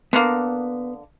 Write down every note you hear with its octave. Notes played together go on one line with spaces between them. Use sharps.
D3 A#3 B3